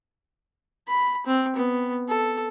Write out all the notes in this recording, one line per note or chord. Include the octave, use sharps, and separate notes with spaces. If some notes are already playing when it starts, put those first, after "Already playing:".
B5
C4
B3
A4